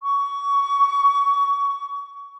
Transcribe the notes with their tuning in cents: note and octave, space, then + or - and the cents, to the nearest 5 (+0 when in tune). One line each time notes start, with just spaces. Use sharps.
C#6 +25